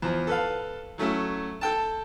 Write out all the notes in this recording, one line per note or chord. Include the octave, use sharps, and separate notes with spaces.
E2 F3
A4 B4 F5
F#3 A3 C#4 E4
A4 G5 A5